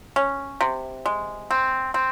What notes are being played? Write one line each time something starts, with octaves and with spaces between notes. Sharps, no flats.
C#4
C3
G#3
C4
C4